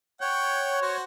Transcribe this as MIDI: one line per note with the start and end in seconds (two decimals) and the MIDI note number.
0.21 0.97 73
0.21 0.81 78
0.21 0.81 79
0.82 1.04 66
0.82 1.04 72
0.82 1.04 78